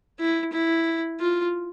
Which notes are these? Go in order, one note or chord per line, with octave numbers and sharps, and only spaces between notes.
E4
E4
F4